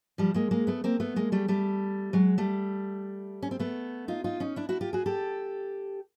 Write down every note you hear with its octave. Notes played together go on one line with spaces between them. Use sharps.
F3 G3
G#3 A#3
G#3 A#3
A3 B3
A#3 C4
A3 B3
G#3 A#3
G3 A3
G3 A3
F#3 G#3
G3 A3
C#4
C4
A3 B3
D#4 F4
D#4 F4
C#4 D#4
D4 E4
E4 F#4
F4 G4
F#4 G#4
G4 A4